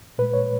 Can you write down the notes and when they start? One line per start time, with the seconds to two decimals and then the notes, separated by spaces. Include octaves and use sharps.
0.18 A#2 G#3 B4
0.33 C#5